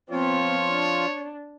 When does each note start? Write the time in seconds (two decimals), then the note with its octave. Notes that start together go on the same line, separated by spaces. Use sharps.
0.10 F3 B3 C4 F4 C#5
0.68 D4